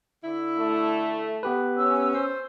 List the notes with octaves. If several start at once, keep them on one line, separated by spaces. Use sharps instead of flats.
D3 E4
A3
B3 G4 B4
C#4 E6
C5